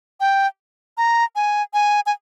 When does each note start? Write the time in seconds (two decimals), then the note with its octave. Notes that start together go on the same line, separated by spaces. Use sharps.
0.20 G5
0.98 A#5
1.36 G#5
1.74 G#5
2.06 G#5